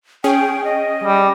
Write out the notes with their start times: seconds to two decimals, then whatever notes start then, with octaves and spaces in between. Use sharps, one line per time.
0.24 C#4 G#4 G5
0.64 D#5
1.04 G3